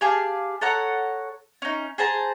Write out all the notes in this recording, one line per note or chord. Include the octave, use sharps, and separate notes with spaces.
G4 G#4 F5 A5
A4 C#5 F#5 A#5
C#4 D#4
G#4 C5 A5 A#5